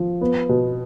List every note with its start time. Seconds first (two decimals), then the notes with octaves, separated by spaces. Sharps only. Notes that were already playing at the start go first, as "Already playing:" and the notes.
Already playing: F3
0.21 B3
0.49 B2